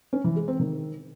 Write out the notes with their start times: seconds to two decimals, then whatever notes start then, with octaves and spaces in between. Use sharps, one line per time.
0.13 C#4
0.24 E3
0.36 G#3
0.48 C4
0.59 D#3